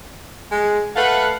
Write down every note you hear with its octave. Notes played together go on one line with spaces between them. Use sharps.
G#3
A3 B4 F5 F#5